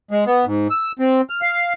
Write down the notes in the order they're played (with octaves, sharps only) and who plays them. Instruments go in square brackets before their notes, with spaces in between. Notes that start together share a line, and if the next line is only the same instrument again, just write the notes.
[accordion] G#3
B3
G#2
E6
C4
F6
F5